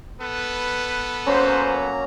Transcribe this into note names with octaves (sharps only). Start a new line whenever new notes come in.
B3 A4 B4
F#3 A#3 C#4 C5 A#5